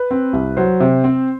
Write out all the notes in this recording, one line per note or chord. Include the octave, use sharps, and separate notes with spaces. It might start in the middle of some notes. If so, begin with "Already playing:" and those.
Already playing: B4
C4
C2
F#3 C5
C3
C4